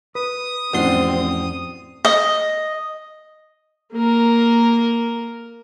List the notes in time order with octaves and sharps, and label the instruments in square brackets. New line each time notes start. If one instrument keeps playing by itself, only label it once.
[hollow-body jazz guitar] B4 [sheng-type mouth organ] D#6
[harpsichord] A1 C6 [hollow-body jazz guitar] F2 D4 F#4 [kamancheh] C4
[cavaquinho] D#5
[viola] A#3 A#4